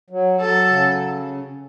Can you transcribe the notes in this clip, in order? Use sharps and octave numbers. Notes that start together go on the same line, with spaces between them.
F#3
F#3 A4
C#3